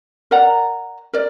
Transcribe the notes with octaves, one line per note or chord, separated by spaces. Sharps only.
A#4 D5 F#5 A#5
A#4 D5